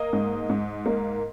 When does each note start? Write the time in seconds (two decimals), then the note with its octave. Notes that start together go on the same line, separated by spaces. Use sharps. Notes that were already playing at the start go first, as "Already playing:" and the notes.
Already playing: A#3 D#5
0.13 G#2
0.49 G#2
0.86 A#3